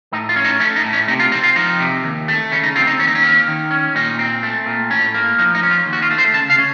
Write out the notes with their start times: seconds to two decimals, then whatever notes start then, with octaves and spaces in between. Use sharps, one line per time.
0.12 A2 D#4
0.29 F4
0.36 C#4
0.45 D#4
0.60 A3 C#4
0.76 D#4
0.85 A2
0.93 C#4
1.08 C3 D#4
1.20 F4
1.32 C4 D#4
1.43 F4
1.56 F3 D#4
1.80 C3
2.04 D#2
2.28 A3
2.52 C#3 C#4
2.63 D#4
2.76 C4 F4
2.87 D#4
2.99 D#2 C#4
3.08 D#4
3.15 C#4
3.23 A#3
3.48 D#3
3.71 C#4
3.95 A#2 D#4
4.19 C4
4.43 A3
4.66 A#2
4.91 A2 C#4
5.14 A#3
5.38 F3 D#4
5.55 D#4
5.63 C#4
5.71 F4
5.86 D#2
5.93 F#4
6.02 F4
6.11 A3
6.18 C5
6.34 C#3 A5
6.50 F5
6.58 C#4